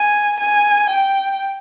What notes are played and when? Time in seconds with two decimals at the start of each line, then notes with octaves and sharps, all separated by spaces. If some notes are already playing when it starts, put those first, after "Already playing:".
Already playing: G#5
0.39 G#5
0.89 G5